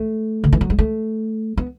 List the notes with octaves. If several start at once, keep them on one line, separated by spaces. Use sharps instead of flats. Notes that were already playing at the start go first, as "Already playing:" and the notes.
Already playing: A3
D3
E3
F#3
G#3
A3
B3